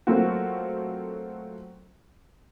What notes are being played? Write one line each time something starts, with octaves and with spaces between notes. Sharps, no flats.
F#3 A3 A#3 C4 F4 F#4